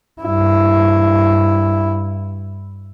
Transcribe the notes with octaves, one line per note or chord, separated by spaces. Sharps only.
G2 E4